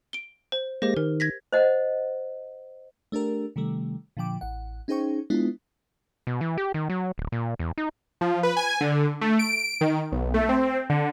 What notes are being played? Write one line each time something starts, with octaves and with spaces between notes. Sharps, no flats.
D7 G7
C5
G#3 A#3 G4 C5 A#6
D#3 A#4
G#6 A#6 B6
C5 D#5 F#5
A3 D4 G4 A#4
C3 D#3 G3 A3
A#2 D3 F3 G5 D6
A1 F#5
C#4 D#4 G#4 C5 G5 C#6
G#3 B3 D4 E4 F4
B2
E3
G4
D#3
F#3
D1
A#2
E2
D#4
F3
B4
G#5
D3
A3
D7
D#3
B1
A3
C4
D3